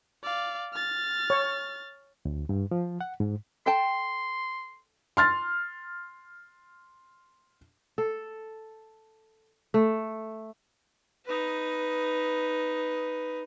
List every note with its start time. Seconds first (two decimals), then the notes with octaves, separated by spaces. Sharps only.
0.23 D5 F5
0.73 F6 A6
1.30 C#5
2.25 D2
2.49 G2
2.71 F3
3.01 F#5
3.20 G#2
3.66 A4 G5 A5 C6
5.17 C6 F6 A6
7.98 A4
9.74 A3
11.25 D#4 B4